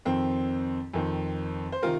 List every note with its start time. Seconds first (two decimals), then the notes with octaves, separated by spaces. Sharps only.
0.05 F2 D#3 C4
0.94 F2 D#3 C4
1.72 C5
1.83 C3 D#3 F4 A#4